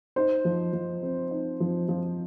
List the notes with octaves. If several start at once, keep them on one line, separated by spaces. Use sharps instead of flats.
D#4 C5
F3
F3
C4
D#4
F3
F3